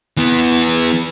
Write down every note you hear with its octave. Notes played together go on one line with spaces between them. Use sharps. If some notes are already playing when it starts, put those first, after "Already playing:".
E3 B3